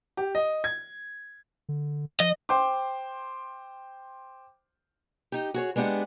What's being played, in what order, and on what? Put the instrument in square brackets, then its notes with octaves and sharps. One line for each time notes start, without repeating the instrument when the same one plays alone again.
[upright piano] G4
D#5
G#6
[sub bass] D3
[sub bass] F3 [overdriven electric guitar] D#5
[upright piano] C5 G5 C6 D6
[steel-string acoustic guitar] D#4 G4
F#4 G#4 C#5
G#3 B3 D4 G4 F#5